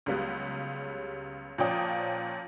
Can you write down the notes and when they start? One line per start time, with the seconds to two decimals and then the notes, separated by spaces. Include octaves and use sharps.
0.06 C#2 C#3 F#3 G3 B3
1.58 A#2 F3 C#4 D5 G5 D#6